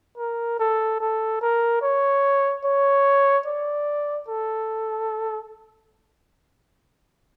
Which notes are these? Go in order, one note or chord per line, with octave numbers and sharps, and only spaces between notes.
A#4
A4
A4
A#4
C#5
C#5
D5
A4